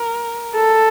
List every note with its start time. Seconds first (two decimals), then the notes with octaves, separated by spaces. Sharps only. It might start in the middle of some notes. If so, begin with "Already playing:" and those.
Already playing: A#4
0.56 A4